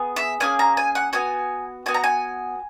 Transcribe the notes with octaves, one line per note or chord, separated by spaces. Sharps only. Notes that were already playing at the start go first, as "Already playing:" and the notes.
Already playing: B3 G#4
E5
A#3 C#4 G#4 G#5
A#5
G#5
F#5
B3 F#4 G#5
B3 F#4 G#5
A#5
G#5